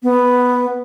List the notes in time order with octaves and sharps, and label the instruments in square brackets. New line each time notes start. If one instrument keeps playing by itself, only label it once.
[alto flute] B3